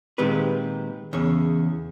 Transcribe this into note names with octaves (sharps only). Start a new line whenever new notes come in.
A#2 D#3 G#3 C4 G4 B4
E2 C#3 C#5